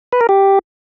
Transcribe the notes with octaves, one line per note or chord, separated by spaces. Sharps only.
B4
A#4
G4